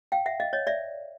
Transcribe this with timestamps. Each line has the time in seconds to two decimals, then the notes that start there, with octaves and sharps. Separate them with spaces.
0.12 F5 G5
0.26 E5 F#5
0.40 D#5 F5
0.53 C#5 D#5
0.67 D5 E5